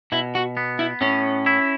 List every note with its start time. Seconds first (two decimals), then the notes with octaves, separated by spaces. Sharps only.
0.12 B2 E4
0.35 F#4
0.57 B3
0.79 E4
1.01 A2 C#4
1.46 E4